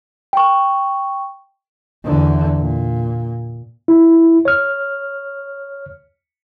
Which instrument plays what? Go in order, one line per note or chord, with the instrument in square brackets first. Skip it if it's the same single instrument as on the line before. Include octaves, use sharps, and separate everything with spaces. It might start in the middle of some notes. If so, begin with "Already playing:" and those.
[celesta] G5 C#6
[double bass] E2 D3
A#2
[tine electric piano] E4
C#5 F6